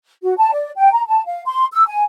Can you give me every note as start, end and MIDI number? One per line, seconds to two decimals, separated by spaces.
0.23 0.35 66
0.38 0.50 81
0.51 0.69 74
0.75 0.91 79
0.92 1.04 82
1.06 1.24 81
1.25 1.41 77
1.45 1.65 84
1.72 1.85 88
1.86 2.03 80